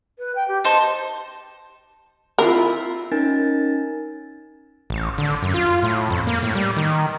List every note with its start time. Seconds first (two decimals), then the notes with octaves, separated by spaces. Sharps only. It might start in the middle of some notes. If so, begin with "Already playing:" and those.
0.18 B4
0.36 G5
0.48 G4
0.64 D#4 C5 A5
2.39 C4 E4 F4 A#4
3.12 C#4 D#4 A#4 G#5 A6
4.90 A1
5.18 D3
5.42 F#2
5.54 F4
5.83 A2
6.10 F2
6.27 A#3
6.42 A2
6.55 G3
6.77 D#3